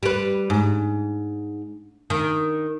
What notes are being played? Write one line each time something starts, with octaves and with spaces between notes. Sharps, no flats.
G3 B4
G#2
D#3